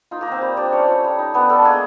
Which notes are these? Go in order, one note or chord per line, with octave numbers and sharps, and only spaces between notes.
D#4 F4
A#3 A#4
C4 D#4 C5
G3
G3 D4 D5
A3 C#4 C#5
F4
G3
D#4
B3 D4 B4
A3 D4 A4
G#3 A#3 G#4